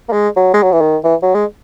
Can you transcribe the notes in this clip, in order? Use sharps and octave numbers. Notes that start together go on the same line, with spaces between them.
A#3
G#3
F#3
G#3
F#3
E3
D#3
E3
F#3
G#3